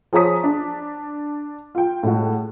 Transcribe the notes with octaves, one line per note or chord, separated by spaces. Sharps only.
F3 G#4 C#5 A#5 D#6 B6
D4
F4 G5
A2 G#3 F#4